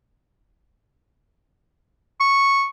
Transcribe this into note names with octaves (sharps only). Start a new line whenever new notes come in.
C#6